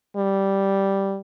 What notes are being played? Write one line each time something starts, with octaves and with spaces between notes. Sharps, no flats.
G3